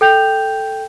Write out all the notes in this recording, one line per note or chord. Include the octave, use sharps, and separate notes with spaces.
A4 G5 G6 F7